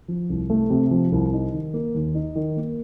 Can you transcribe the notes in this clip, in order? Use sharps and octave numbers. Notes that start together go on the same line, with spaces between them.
F3
C2
A3
C3
F3
C2
D#4
D#3
A#3
D#2
D#4
D#3
A#3